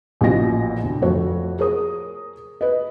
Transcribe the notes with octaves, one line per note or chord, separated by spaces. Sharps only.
A1 A#2 F3 F#4 D#5 A#6
D2
F2 A3 F#4 C#5
G#4 A#4 C#5 D#6
B4 D#5